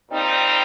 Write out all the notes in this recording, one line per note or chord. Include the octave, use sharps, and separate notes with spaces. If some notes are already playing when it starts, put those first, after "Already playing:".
A#2 G3 C4 D#4